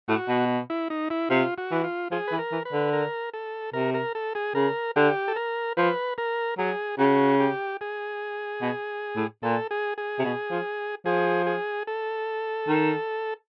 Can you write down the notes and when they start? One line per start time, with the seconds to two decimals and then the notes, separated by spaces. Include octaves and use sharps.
0.08 A2 F#4
0.28 B2
0.70 E4
0.90 D#4
1.10 E4
1.30 C3 F4
1.58 F#4
1.71 E3
1.84 F4
2.11 F3 G#4
2.28 E3 B4
2.39 A#4
2.52 E3
2.65 B4
2.73 D3
2.93 A#4
3.34 A4
3.73 C3 A#4
3.94 A#4
4.15 A4
4.35 G#4
4.55 C#3 A#4
4.96 D3 G4
5.28 A4
5.36 A#4
5.77 F3 B4
6.18 A#4
6.58 F#3 G#4
6.99 C#3 F#4
7.40 G4
7.81 G#4
8.62 B2
9.16 A2
9.43 A#2 A4
9.71 G#4
9.98 G#4
10.19 C3
10.25 B2
10.51 F3
11.06 F3 G#4
11.46 G#4
11.87 A4
12.68 D#3